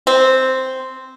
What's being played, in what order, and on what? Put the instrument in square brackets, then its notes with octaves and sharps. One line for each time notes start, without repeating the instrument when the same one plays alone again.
[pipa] C4